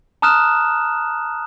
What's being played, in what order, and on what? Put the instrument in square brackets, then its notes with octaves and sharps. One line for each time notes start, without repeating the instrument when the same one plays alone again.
[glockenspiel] A5 A#5 D#6 F6 F#6 E7